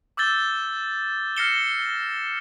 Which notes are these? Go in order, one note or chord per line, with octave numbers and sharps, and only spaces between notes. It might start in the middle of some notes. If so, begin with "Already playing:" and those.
D6 E6 G6 A6 G7
F6 A#6 C7 C#7 E7 G7